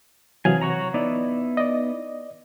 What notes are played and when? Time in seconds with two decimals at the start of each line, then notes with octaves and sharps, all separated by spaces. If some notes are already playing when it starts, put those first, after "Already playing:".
0.45 C3 E3 F#3 G#4 F5 G#5
0.61 F#4 C#5 A#5
0.94 B3 D#4 E4 D5
1.57 D5 D#5